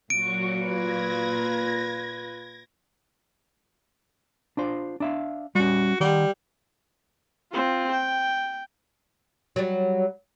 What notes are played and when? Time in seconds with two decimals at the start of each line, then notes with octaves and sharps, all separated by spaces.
0.10 A#2 F#3 F#4 C#6 D7
0.63 F4 B4 G#6 A#6
4.57 D4 F4 C5
5.00 D4 E5 F5
5.55 G3 C#4 F#4
6.00 D#3 G3 F#5
7.52 C4 F4
7.91 G5
9.56 F#3 G3